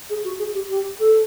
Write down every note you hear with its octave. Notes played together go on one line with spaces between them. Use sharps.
G#4
F#4
G#4
G4
G4
A4